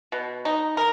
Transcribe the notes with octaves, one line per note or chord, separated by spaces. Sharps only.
B2
D#4
A#4